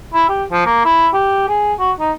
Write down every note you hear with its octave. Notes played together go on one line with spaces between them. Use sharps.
E4
G4
F3
A#3
E4
G4
G#4
F#4
D#4